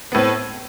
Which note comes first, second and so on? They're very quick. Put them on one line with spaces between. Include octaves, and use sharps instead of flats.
B3 A2 C4